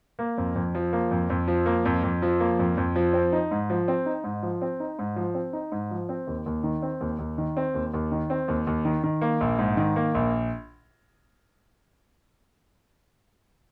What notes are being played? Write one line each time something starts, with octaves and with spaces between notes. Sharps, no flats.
A#3
F2
F2
F3
A#3
F2
F2
F3
A#3
F2
F2
F3
A#3
F2
F2
F3
C4
D#4
G#2
F3
C4
D#4
G#2
F3
C4
D#4
G#2
F3
C4
D#4
G#2
F3
C4
D#2
D#2
D#3
C4
D#2
D#2
D#3
C4
D#2
D#2
D#3
C4
D#2
D#2
D#3
D#3
A#3
A#1
G#2
D#3
A#3
A#1